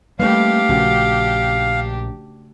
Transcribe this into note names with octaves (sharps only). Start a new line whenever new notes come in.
G3 A3 A#3 D4 G4 B4 F5
A#1 C#3 F#4